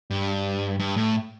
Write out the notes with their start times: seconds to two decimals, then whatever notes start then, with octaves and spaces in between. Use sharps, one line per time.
0.10 G2
0.79 G2
0.97 A2